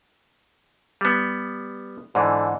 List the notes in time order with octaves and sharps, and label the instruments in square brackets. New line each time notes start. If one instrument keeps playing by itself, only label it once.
[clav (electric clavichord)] G3 B3
[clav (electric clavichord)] G#2 E3 [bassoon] D3